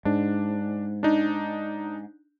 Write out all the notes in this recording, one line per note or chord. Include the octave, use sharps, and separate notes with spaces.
G#2 D4
D4 D#4